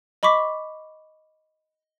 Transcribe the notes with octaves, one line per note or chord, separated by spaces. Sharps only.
D#5 B5 C#6 D6 B6